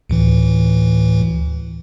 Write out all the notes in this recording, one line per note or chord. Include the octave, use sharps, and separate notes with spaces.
D2 A2 E3